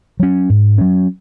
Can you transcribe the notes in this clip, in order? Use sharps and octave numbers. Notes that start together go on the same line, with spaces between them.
F#3 C#4
G#2
F#3 C#4